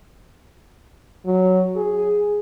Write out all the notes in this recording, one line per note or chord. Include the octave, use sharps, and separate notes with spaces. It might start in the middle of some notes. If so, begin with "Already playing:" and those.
F#3
G#4